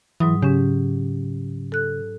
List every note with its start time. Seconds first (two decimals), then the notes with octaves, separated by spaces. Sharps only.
0.20 G#2 E3 F#3 D#6
0.42 G#2 C#3 C#4 G4
1.72 A4 F#6